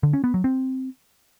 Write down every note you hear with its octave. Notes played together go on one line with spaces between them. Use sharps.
D3
C#4
B3
F#3
C4